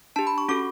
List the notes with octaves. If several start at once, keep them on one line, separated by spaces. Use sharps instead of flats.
D4 G4 A5
B5
C#6
C#4 F#4 A4 D6